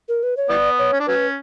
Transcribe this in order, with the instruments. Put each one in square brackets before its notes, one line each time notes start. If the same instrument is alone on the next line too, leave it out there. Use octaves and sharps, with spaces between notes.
[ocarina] A#4
B4
C#5
[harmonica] E3 G3 B3 [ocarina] D5
[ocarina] C#5
[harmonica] C#4
D4
[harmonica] F#3 C#4 [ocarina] B4